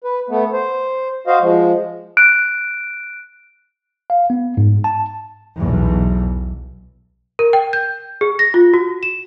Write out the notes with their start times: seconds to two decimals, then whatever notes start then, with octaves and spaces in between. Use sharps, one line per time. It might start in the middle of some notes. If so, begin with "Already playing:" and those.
0.04 B4
0.29 A3 B3
0.52 C5
1.27 F#4 C5 D#5 F5
1.42 F3 G#3
2.17 F#6 D7
4.10 F5
4.30 B3
4.57 G#2
4.84 A5
5.58 B1 E2
7.39 A#4
7.53 G5
7.73 G6
8.21 G#4
8.39 A#6
8.54 F4
8.74 F#4
9.03 E7